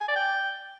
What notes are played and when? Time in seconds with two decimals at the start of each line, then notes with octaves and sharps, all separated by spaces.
0.01 G#5
0.08 D5
0.16 G5